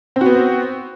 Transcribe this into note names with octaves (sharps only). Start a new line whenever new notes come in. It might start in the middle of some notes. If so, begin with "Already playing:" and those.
B3 C4 F#4